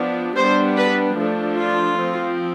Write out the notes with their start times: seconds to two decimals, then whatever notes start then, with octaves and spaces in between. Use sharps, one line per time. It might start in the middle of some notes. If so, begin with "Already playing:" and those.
Already playing: F3 B3 D4
0.37 G3 B3 D4 C5
0.77 B4
1.17 F3 A3 D4
1.57 F4
1.98 F3 C4